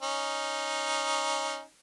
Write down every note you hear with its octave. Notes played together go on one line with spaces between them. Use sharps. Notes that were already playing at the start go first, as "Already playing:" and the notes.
C#4 D#4